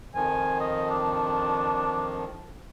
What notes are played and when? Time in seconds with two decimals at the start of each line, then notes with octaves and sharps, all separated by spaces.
0.15 F2 D#3 F3 G#5
0.61 D#5
0.90 D4